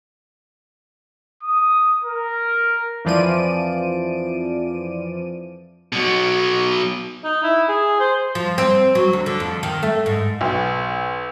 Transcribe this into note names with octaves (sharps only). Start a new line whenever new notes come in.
D#6
A#4
F2 E3 F3 D5 D7 D#7
B2 F#3
D#4
E4
G#4
C5
F3
C4
F#3
D2
D3
F2
D#3
A3
G#2
B1